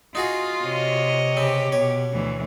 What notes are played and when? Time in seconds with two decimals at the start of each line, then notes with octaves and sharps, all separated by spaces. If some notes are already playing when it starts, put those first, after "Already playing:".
0.15 D#4 F4 F#4 G#4
0.64 C3 C#5 D#5
1.37 C#3 C4 G4
1.72 B2 C#5
2.13 D2 E3